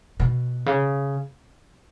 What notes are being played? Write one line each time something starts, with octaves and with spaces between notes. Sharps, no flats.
B2
C#3